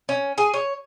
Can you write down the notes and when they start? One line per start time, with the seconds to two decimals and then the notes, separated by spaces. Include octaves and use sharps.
0.09 C#4
0.38 G#4
0.54 C#5